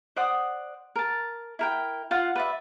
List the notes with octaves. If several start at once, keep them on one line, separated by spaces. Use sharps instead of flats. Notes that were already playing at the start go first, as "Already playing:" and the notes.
C5 D5 F#5 D#6
A#4 A5
E4 A#4 G5
F4 F5 F#5
B4 D5 E5